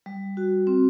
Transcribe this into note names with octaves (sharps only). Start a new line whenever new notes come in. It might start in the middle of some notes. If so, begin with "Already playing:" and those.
G3
F#4
C4